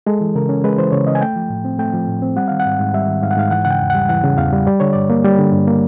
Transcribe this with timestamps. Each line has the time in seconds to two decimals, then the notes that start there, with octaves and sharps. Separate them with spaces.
0.06 G#3 A4
0.21 E3
0.35 C#3 A#4
0.49 C#4
0.64 G#3 B4
0.78 E3 C5
0.92 C#3 C#5
1.07 C#4 D#5
1.15 G#5
1.21 A3 G5
1.36 F3
1.50 A2
1.65 C4
1.79 A3 G5
1.94 F3
2.08 A2
2.22 C4
2.36 G3 F#5
2.48 D#3 F5
2.60 F#5
2.66 G#2
2.80 G#2
2.94 G3 E5
3.08 D#3
3.23 G#2 F5
3.31 F#5
3.37 G#2 F5
3.51 E3 F#5
3.65 C#3 F#5
3.71 G5
3.80 E2
3.90 G3 F#5
4.09 E3 F#5
4.23 C#3
4.38 E2 F5
4.52 G3
4.66 G3 D5
4.80 D3 C#5
4.93 G2 D5
5.10 A#3
5.24 G3
5.39 D3
5.52 G2
5.67 A#3